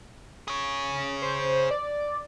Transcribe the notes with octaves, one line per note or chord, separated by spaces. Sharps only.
G#4 C#5
C5
D5